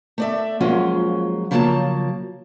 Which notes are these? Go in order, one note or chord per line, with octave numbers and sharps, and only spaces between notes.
A3 D5 E5
F3 F#3 G#3 A#3 C#4 F4
C#3 F3 F#3 A#3 F5 A5